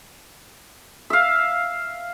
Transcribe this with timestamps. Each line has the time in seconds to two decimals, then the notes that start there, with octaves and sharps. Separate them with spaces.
1.10 E5 F5